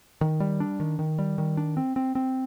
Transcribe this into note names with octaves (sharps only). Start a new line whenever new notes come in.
D#3
G3
D4
D#3
D#3
G3
D#3
D4
C4
C4
C4